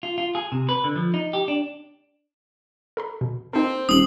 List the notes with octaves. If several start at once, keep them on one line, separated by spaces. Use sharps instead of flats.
F4
F4
G#4
C3
B4
D3
F3
D#4
G4
D4
A4 A#5 B5
B2
A#3 C4 D#4 A4
D#1 D#6 F#7